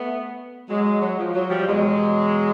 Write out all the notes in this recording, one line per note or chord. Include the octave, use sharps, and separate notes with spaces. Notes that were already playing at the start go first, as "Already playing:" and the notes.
Already playing: A3 B3
F#3 G#3
F#3
F3
F#3
F3 G3
E2 B2 F#3 G#3